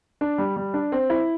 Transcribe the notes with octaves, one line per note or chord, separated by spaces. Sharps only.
D4
G3
G3
D4
C4
E4